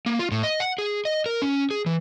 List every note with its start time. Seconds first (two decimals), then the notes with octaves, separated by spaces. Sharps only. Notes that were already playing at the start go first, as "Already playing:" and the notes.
0.06 A#3
0.19 F4
0.32 A2
0.43 D#5
0.60 F#5
0.78 G#4
1.05 D#5
1.26 A#4
1.42 C#4
1.71 G#4
1.86 E3